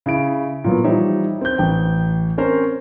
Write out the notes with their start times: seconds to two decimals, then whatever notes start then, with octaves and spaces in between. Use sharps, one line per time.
0.06 C#3 E4 D7
0.64 A#2 F#3 B3
0.84 E3 F3 G3 D#4 C#5 E5
1.41 C4 G6
1.58 A1 G5
2.38 C4 C#4 A#4 C5